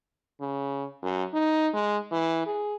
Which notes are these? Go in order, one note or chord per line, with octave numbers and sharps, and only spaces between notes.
C#3
F#2
D#4
G#3
E3
G#4